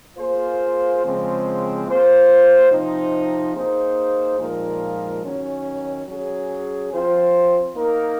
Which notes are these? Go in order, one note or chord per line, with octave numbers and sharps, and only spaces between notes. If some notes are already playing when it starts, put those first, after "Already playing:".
A#3 F4 G#4 C5
C#3 F3 G#3 C4
A#3 F4 C5
C3 F3 C4 D#4
A#3 D#4 G#4 C5
A#2 F3 G#3 D#4 A#4
D#3 F#3 C#4
F#3 C#4 G#4
F3 C4 F4 C5
A#3 D#4 A#4